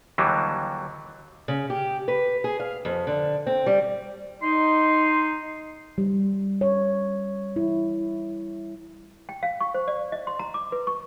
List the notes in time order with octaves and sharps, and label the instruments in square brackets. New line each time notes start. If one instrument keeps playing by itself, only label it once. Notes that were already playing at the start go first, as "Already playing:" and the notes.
[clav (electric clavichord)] D#2 D3 E3 F#3 G3
[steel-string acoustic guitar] C#3
G4
B4
G#4
F5
F2
D3
C4
G3
[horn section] D#4 [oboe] C6
[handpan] G3
C#5
E4
[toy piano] G5
F5
C#6
C5
D5
D#5
C6
A#5
D6
B4
C#6